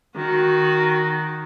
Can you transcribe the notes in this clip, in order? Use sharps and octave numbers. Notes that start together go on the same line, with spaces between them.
D#3 F#4